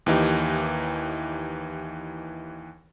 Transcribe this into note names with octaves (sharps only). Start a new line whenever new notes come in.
D#2 E3 D#4 G4